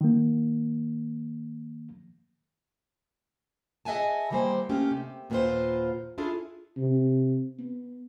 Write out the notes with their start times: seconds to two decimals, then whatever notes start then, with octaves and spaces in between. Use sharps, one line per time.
0.01 D#3 A#3
3.85 G#4 D#5 E5 F#5 G#5 A5
4.30 D#3 E3 G3 A#3 B3 C5
4.69 A3 A#3 C#4 G4
4.91 C3
5.30 D#2 A#2 B3 C#4 F4 C5
6.18 D4 E4 F4 G#4 A4
6.77 C3
7.59 B3